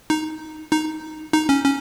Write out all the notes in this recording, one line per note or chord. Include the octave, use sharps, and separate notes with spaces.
D#4
D#4
D#4
C#4
C#4